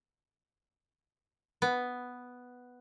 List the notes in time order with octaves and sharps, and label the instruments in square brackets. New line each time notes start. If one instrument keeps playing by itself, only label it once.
[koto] B3